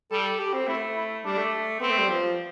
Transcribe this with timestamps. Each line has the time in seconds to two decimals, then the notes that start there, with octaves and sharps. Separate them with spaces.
0.11 G3 A4
0.39 G4
0.53 C4
0.67 A3 E4
0.96 E4
1.24 G3 D4
1.38 A3
1.80 B3 C4
1.90 A3
1.99 G3
2.08 F3